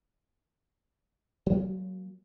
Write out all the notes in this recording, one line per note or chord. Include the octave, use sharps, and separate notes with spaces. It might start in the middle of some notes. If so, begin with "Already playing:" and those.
F#3 G#3 A#3